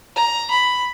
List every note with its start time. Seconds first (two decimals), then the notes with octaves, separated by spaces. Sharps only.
0.16 A#5
0.51 B5